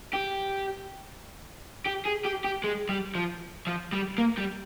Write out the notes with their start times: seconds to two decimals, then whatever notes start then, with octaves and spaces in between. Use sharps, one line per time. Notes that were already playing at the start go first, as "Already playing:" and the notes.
0.14 G4
1.87 G4
2.06 G#4
2.25 G4
2.45 G4
2.64 G#3
2.89 G3
3.15 F3
3.67 F3
3.93 G3
4.18 A#3
4.38 G3